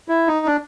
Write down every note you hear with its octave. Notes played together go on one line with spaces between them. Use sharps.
E4
D#4
D4